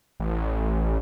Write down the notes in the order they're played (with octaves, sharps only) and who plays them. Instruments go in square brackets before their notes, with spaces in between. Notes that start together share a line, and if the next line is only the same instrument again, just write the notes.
[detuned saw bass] A1